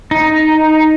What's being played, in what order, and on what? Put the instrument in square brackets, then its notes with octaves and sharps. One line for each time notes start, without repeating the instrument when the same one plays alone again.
[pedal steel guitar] D#4